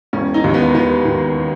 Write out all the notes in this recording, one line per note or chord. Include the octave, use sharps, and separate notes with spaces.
E1 C#4
D#4
D#2
B3
D#3 B3
D#3